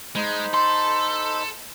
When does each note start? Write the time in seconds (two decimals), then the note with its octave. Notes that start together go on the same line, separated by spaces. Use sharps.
0.15 G#3 D#4 C5 B5
0.54 A4 C6